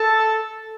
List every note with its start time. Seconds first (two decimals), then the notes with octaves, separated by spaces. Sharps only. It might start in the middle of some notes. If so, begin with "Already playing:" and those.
Already playing: A4